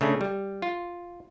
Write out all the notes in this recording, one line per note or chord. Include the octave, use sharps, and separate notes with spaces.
C#3 A3 C#4 D4
G3
F4